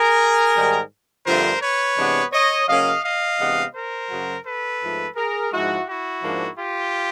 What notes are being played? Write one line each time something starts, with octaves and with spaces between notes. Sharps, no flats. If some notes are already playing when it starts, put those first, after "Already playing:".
Already playing: G#4 A#4
G#2 D#3 G3
G2 D3 F3 A3 C4 A#4 C5
B4 C#5
C3 E3 G#3 B3 D4
C#5 D#5
C#3 F#3 A#3 C#4 D#5 F5
D#5 F5
C3 E3 G#3 B3 D4
A#4 C5
F#2 C#3 F#3
A4 B4
G#2 F3 A3
G#4 A#4
G#2 F3 G#3 E4 F#4
E4 F#4
G#2 F3 A#3 D4
F4 G4